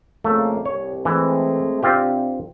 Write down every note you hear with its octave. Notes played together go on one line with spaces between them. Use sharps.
F2 C#3 A3 A#3
C2 C#5
E3 G#3 A3 C4
C3 C4 D4 F4 G4